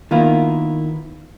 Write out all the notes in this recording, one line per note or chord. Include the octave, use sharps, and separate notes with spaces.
D#3 A#3 B3 E4 F4